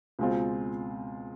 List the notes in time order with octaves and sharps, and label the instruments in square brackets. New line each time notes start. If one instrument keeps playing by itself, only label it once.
[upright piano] C#2 B2 G#3 C4 F4